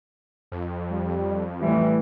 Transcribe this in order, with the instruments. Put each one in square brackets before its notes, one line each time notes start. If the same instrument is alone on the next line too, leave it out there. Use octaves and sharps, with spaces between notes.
[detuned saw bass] F2
[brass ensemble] G3
[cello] A2 G3 [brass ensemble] E3